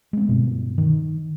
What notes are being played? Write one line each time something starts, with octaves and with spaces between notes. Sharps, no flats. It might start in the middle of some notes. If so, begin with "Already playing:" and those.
G#3 C4
G2 B2
D#3